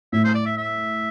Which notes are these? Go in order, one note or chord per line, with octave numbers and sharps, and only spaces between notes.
A2 E5
C5
D5
E5
E5